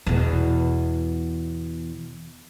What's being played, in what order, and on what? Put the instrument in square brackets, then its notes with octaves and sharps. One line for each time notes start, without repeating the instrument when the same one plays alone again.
[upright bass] E2 B2